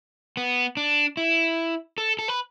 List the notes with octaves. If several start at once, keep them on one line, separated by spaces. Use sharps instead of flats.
B3
D4
E4
A4
A4
B4